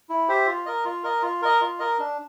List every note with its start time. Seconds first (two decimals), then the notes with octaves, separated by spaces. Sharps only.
0.09 E4
0.28 G4 C5 E5
0.47 F4
0.66 A#4 D#5
0.85 F4
1.03 A#4 D#5
1.22 F4
1.42 A#4 D#5
1.61 F4
1.79 A#4 D#5
1.99 D4